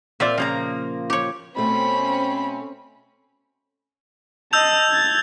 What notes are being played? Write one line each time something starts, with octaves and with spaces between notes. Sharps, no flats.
A#2 C4 F4 D5 E5
C#3 F3 A#3 A#5
G4 C#5
B2 A3 C4 C#4 B5
D#5 A5 E6 G6 F7
G#6 A6